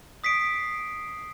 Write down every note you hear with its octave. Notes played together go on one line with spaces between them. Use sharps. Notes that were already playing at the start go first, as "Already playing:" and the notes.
D#6 B6 C7 D7